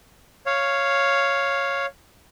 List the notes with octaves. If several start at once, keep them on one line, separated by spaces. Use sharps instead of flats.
C#5 F5